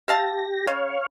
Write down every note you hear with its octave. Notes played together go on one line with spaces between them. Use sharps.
G4 E5 F5 A5 A#6
C#3 C#5 F5